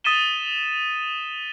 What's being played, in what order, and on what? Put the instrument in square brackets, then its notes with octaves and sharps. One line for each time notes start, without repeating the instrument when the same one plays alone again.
[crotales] D#6 A6 B6 D#7 E7 G7